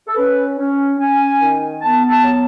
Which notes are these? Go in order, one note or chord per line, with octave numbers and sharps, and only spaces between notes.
A4
C#4 B4
C#4
C#4 G#5
D#3
B3 A5
A5
F#3